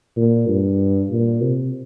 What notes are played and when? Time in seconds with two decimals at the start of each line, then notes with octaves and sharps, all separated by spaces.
0.16 A#2
0.48 G2
1.11 A#2
1.42 C3